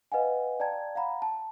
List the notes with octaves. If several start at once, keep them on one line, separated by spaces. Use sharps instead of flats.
B4 D#5 F5 F#5 G#5
D5 F5 G5 A5 A#5 G#6
F5 F#5 A#5 B5
A5